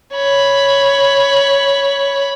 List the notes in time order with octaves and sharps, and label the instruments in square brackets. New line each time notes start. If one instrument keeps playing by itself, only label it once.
[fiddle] C#5 B5